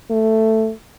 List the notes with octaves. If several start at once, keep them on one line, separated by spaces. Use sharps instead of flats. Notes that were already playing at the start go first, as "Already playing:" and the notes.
A3